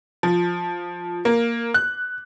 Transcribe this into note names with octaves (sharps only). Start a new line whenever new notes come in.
F3
A#3
F#6